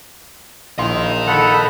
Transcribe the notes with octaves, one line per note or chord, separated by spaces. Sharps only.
A#1 E4 A#4 D#5 F5 C6
A4 F#5 B5